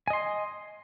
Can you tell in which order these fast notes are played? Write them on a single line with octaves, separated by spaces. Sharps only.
G#5 D#5 C6